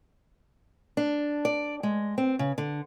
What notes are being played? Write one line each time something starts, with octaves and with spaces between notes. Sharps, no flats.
D4
D5
G#3
C4
C#3
D3